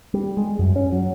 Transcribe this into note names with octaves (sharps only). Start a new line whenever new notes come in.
G3
G#3
F#2
C#4
F#3